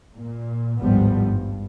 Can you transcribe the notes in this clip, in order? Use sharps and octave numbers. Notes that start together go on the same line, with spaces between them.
A#2
G#1 D2 A2 F3 G3 B3
G2